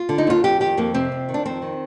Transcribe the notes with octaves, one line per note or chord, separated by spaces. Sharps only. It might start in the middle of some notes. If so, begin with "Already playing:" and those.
Already playing: F4
D3
D#4
D#2 F4
F2 G4
D#3 G4
F2 A#3
C3 C4
F2
D#3
D4
F2 C4
D#3